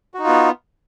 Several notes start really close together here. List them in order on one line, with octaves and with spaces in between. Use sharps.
F#4 D#4 F4 B3